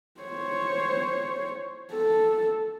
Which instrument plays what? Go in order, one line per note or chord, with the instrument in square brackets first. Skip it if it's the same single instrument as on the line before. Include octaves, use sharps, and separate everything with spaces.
[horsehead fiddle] C5 C#5
A4